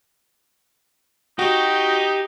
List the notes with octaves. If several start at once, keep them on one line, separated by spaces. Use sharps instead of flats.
D#4 F#4 G4